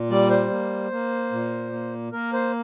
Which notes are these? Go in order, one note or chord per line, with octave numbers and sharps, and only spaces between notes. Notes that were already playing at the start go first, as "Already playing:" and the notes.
Already playing: A#2
G3 D5
C5
A#3
A#3
A#2
A#3
A#3 A#4
C5